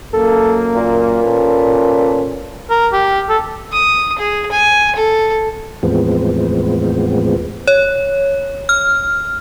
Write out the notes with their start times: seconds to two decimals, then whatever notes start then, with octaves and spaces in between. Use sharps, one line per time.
0.14 F#2 A#3 A4
0.76 A#2
1.24 C#4 A4 B4
2.70 A#4
2.93 G4
3.29 A4
3.72 D#6
4.18 G#4
4.51 G#5
4.95 A4
5.83 E2 A2 F3 G#3 B3 C4
7.67 C#5
8.69 F6